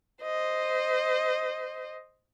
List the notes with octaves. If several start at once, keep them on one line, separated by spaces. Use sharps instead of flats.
C5 D#5